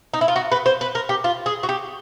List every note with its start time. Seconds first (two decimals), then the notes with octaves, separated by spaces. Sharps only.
0.14 D#4
0.21 E4
0.28 F4
0.36 F#4
0.52 B4
0.66 C5
0.81 B4
0.95 A#4
1.09 G4
1.24 F4
1.46 G#4
1.63 F#4
1.69 G4